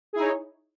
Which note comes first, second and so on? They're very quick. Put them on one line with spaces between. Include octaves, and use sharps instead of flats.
G#4 E4 D#4 C#5